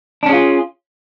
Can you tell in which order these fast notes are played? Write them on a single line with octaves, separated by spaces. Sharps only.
D4 C#4 G#4 F4